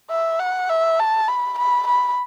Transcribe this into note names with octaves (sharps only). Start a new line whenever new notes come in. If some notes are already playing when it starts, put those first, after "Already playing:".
E5
F#5
E5
A5
B5
B5
B5